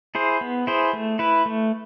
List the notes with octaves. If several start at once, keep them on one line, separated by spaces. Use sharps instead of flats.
E4 G#4 C5
B3
E4 G#4 C5
A3
E4 B4
A3